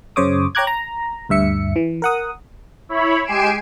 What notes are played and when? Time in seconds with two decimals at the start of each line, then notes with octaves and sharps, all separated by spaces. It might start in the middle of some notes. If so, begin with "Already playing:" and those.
0.16 F#2 C#3 C5 C#5 D6 D#6
0.55 C#5 G5 A#5 D6 F#6 G#6
0.67 A#5
1.29 D2 G2 E5 C#7
1.76 E3
2.02 A#4 F#5 D#6
2.89 E4 C#5 B5
3.25 G#3 G4 G#5 C7 D7 E7